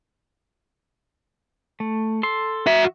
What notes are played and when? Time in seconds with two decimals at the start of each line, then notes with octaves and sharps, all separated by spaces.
1.80 A3
2.23 A4 C6
2.66 F#4 E5